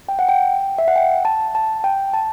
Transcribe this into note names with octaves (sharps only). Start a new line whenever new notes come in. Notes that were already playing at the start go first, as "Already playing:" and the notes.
G5
F#5
G5
E5
F#5
G5
A5
A5
G5
A5